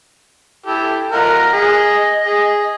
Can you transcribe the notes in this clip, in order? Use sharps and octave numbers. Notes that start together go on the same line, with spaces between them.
E4 G4 A4
F4 A#4 D#5 F#5
G#4
G#4